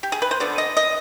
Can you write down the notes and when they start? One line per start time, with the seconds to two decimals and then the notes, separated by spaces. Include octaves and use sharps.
0.03 G4
0.12 G#4
0.22 B4
0.31 C5
0.40 D3 F3 B3 D5
0.58 D#5
0.77 D#5